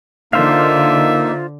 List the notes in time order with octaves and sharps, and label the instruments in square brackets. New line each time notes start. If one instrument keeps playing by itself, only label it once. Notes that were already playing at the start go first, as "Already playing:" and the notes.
[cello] D3 [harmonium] A#3 D#4 [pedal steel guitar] F4 C5 F5 [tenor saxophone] E5